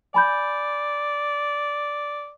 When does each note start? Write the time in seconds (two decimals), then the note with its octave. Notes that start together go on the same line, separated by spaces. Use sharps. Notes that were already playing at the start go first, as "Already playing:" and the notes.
0.14 D5 G#5 B5 G6